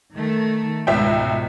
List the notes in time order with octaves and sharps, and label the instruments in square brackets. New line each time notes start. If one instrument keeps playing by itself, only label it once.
[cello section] D#3 A3
[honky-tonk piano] C#2 E5 G5 [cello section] G#2 B2